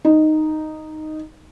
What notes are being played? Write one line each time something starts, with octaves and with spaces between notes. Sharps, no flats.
D#4